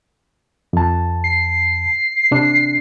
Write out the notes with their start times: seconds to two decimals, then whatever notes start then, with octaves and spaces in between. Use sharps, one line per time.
0.73 F2 A5
1.24 C7
2.31 C3 D4